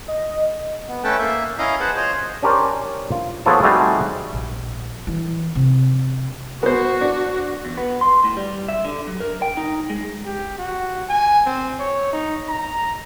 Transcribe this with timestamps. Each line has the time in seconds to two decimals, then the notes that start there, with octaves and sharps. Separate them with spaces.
0.08 D#5
0.88 B3
1.04 A3 C#4 A4 B4 G5 A5
1.19 A#3 E5
1.58 C#4 E4 D#5 F5 A#5
1.80 G#4 B4 C5 F#5 A5
1.96 F4 C5 C#5 D#5
2.43 C#4 D4 G4 A#4 C5 D5
3.12 F4
3.46 F3 B3 G#4 A4 C#5 A5
3.63 G3 A3 C4 D#4 F#4 G#4
4.33 A#1
5.07 E3
5.55 C3
6.63 B3 F#4 C5
7.01 D4
7.65 E2
7.77 B3
8.01 C6
8.24 A2
8.37 G3
8.68 E5
8.85 D3
9.07 F#3
9.20 A#4
9.42 G5
9.57 D#4
9.90 G#3
10.26 G4
10.58 F#4
11.09 G#5
11.46 C4
11.79 C#5
12.13 D#4
12.48 A#5